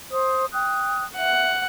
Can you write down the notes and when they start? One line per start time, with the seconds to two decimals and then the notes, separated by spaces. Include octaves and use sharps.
0.11 C5 D#6
0.54 G5 D#6 F#6
1.16 E5 F#5